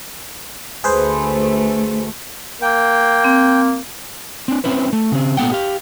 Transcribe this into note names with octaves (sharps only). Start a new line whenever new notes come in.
D2 A3 G#4 B4 C5
A#3 G5
C4
C4 D4
C4 C#4 E4 B4 C5
A3
C#3 C4
A#2 A3 B3 F#5 G5
G4 F5